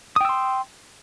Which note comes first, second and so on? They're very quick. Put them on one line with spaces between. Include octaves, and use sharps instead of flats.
D#6 G5 E6 C6